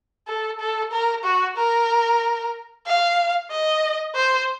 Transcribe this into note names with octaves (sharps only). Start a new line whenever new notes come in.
A4
A4
A#4
F#4
A#4
F5
D#5
C5